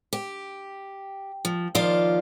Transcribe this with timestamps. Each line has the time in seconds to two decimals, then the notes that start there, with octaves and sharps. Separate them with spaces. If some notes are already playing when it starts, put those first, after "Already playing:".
0.13 G4
1.45 F3
1.75 D#2 F3 F4 D5 F5